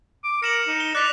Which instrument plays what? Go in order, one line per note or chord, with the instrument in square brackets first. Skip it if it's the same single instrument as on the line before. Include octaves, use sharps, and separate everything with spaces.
[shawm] D6
[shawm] A#4 [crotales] C#7 E7 F#7
[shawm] D#4
[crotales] G7
[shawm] D5 [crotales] F#6 B6 F7